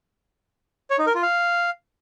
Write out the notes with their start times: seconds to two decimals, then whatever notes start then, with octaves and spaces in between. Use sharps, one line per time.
0.90 C#5
0.99 D#4
1.07 A#4
1.15 F4
1.23 F5